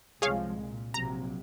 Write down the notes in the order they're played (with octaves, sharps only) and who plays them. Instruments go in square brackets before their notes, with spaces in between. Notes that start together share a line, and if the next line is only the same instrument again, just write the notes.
[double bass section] C2 F3 G#3 [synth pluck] G#4 C#5 F5
[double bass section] A#2
[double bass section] A#1 C3 F#3 [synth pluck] A#5